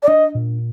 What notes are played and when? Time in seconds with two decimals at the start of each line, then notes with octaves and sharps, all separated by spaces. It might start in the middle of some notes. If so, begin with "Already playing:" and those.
0.03 D5
0.08 D4 D#5
0.35 A#2